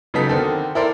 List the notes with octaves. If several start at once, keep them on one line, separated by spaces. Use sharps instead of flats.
C#3 F#3 B3 D#4 A4 B6
D3 D#3 C4 A4
E4 A4 A#4 C5 D5 C6